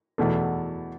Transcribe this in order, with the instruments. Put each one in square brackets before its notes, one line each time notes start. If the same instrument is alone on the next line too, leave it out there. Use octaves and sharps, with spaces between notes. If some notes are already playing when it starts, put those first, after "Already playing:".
[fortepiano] E2 B2 A3